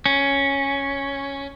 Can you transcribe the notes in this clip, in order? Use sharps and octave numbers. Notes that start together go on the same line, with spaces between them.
C#4